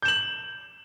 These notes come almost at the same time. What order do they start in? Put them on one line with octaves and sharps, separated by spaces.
G6 E7 F#7